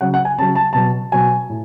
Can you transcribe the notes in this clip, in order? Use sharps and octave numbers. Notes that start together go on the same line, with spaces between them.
C#3 F#3 F#5
F#5
G#5
C#3 F#3 A5
A5
B2 F#3 A5
B2 F#3 G#5
A2